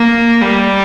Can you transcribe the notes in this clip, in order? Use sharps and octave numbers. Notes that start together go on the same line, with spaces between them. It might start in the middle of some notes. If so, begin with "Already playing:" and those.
Already playing: A#3
G3